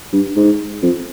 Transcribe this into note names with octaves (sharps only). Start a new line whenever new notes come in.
G2
G#2
F2